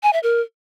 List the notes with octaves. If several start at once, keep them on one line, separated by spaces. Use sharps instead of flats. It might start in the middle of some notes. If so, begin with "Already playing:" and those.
G#5
E5
A#4